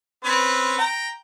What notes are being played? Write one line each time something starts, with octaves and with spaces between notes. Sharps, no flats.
C4 C#4 B4
G5 A#5